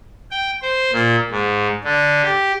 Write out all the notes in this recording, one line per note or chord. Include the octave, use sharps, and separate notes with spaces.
G5
C5
A#2
G#2
D3
G4